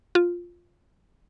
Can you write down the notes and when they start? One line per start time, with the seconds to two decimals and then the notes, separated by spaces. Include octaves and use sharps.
0.15 F4